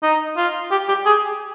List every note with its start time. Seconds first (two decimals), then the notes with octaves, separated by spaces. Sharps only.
0.03 D#4
0.37 F4
0.71 G4
0.88 G4
1.06 G#4